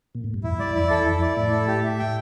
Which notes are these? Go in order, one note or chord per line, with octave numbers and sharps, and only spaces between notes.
A#2
A2
G2
F2 E4
G2 D5
F2 E4
E2 A4
F2 E4
D5
A2 E4
A4
G4
E5
G5